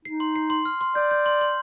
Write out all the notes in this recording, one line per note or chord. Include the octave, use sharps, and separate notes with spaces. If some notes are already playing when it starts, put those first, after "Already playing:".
D#4 C7
C6
C7
C6
F6
C6
D5 G6
G6
C6
C6